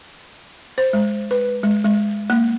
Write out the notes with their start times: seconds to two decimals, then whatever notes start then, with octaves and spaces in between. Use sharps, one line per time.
0.78 C5
0.93 G#3
1.31 B4
1.63 G#3
1.85 G#3
2.30 A#3